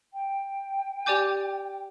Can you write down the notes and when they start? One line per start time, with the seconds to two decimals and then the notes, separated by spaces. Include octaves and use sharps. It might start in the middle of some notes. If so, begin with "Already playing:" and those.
0.13 G5
1.06 G4 D5 G#5 D6 G6